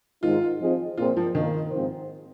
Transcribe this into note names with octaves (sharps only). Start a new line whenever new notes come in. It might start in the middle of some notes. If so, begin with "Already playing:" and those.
G#2 D#3 G#3 D#4 F4
F3 C4 F4 G#4 D#5
A#2 F3 C4 F4 G#4 C5
F3
A#2 D#3 A#3 F4 A#4 D#5
G#2 F3 C4 D#4 C5